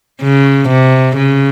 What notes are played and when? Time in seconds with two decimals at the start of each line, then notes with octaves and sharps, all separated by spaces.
0.22 C#3
0.69 C3
1.16 C#3